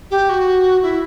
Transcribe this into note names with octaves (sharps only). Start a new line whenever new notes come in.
G4
F#4
E4